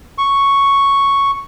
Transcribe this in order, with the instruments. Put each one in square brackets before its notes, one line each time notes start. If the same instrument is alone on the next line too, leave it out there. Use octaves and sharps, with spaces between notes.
[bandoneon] C#6